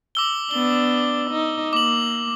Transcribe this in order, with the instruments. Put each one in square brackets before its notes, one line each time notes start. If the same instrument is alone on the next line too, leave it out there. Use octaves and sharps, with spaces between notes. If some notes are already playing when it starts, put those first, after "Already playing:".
[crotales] D6 E6 G7
[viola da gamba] B3 D4 [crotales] G7
[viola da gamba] D#4
[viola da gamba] A#3 [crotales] D6 F#7